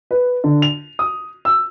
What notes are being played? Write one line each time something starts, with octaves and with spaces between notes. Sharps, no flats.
B4
D3
F7
D#6
E6